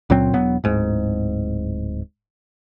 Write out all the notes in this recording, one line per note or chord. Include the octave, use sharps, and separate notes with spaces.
C#2 A#2 F#3 C4
E1 F#3 B3
D1 G#2